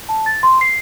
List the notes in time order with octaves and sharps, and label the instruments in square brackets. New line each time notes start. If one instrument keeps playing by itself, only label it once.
[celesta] A5
A6
C6
C7